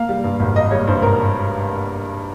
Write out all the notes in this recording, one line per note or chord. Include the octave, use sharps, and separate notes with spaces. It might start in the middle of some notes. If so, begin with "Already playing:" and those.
Already playing: A#3 F5
G3
G2
G#1
A#3 D#5
G3 C#5
G2 C5
G#1 A#4